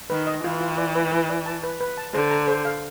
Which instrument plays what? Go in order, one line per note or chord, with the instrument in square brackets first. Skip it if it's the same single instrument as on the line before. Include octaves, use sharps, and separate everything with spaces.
[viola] D#3 [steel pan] B4
[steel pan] D#5
[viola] E3 [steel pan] F4
[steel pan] F4
D5
B4
B4
D5
A5
B4
B4
A5
[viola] D3 [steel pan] C5
[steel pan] A#5
C5
F5